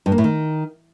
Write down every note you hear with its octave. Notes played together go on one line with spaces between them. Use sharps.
G2
A#3
A2
D#3